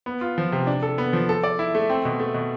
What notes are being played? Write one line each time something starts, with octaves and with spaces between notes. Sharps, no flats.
B3
F4
F3
C3
D4
A4
B3
F3
A4
D5
E4
A3
C4
B2
A3
B2